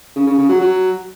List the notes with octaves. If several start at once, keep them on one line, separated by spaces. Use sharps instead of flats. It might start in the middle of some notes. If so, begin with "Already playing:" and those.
C#3
C#3
C#3
F#3
F#3